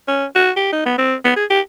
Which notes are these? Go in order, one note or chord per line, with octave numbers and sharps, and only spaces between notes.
C#4
F#4
G4
D#4
B3
C4
B3
G#4
G4